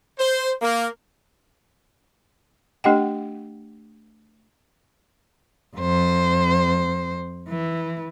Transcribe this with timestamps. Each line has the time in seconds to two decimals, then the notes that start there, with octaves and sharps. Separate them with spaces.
0.18 C5
0.61 A#3
2.84 A3 D4 G4 D#5 F#5 G5
5.77 F2 C5
7.49 E3